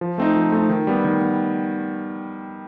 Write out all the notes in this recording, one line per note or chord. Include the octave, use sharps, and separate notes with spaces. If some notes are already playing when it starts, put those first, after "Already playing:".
F3
A3 C4 D#4
F3
A3 C4 D#4
D#3
G3 B3
D#3
B3